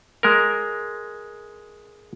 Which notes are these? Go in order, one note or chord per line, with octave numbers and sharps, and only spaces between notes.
G#3 A#4